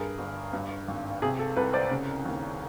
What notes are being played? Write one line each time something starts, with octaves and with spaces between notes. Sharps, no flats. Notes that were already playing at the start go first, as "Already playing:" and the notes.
Already playing: G2 G#4 A#4
G1
G2
G#1
C3 G#4
A4
C2 A4 B4
C5 D5
C#3
D#2